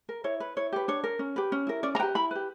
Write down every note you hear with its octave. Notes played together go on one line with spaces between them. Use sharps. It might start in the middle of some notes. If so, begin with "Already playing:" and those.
A#4
E4 C#5
B4
E4 C#5
G4 B4
D4 C#5
A#4
C#4
G4 B4
C#4
E4 A#4
C#4 D5
A#5
G4 B4 G5
E4 B5
G4 B4